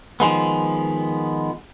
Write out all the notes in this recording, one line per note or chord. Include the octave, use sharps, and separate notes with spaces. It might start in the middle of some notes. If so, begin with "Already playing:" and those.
D#3 F3 G#3 B3